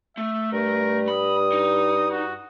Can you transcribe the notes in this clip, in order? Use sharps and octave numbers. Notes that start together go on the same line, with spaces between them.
A3 E5
G2 A#4
B5 D#6
D#4
F#4